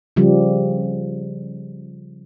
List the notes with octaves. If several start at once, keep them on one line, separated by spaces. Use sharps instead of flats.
C#3 F3 G3